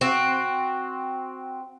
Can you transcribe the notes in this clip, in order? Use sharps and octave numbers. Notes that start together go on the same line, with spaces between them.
C4 F#4